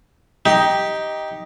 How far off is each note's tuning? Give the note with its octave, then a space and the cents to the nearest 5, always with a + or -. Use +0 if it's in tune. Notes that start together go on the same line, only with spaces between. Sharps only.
D#4 +10 G4 +0